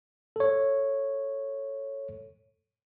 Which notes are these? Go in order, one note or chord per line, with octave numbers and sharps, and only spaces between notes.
A4 C#5